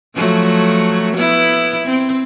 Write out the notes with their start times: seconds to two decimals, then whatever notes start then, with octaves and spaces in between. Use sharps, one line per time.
0.15 F3 F#3 A3
1.16 B3 E4
1.86 C4